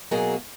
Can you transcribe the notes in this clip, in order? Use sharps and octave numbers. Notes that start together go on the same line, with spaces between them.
B2 F#3 A#3 G#4